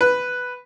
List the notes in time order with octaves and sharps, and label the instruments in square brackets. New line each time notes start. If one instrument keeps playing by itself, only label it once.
[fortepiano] B4